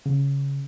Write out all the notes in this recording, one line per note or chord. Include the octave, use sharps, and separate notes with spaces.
C#3